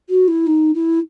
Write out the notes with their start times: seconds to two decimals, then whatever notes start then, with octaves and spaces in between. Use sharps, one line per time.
0.09 F#4
0.28 E4
0.46 D#4
0.74 E4